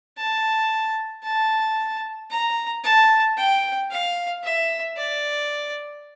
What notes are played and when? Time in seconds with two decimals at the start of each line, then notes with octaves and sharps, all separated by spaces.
0.17 A5
1.23 A5
2.30 A#5
2.84 A5
3.37 G5
3.91 F5
4.43 E5
4.97 D5